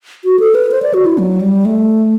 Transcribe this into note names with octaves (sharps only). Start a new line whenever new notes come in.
F#4
A4
B4
C5
D5
F#4
E4
F#3
G3
A3